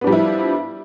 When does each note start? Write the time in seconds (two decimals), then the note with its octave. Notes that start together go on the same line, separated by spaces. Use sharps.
0.01 B3
0.04 D4
0.07 G3
0.10 F3
0.12 E4